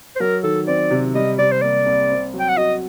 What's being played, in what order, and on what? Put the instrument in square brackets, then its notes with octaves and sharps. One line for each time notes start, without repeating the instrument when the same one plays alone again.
[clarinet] C5
[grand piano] F#3 [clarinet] A#4
[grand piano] D#3 [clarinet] A4
[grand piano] C4 [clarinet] D5
[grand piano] C3
[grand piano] G3 [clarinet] D#5
[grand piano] C3 [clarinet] D5
[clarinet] C5
[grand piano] A#3 [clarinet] D5
[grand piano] C2
C4
F#3
[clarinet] G5
F#5
[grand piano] F#4 [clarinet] D#5